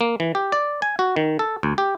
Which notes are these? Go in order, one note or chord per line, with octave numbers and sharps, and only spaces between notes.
A#3
E3
G4
D5
G#5
F#4
D#3
A4
D2
G4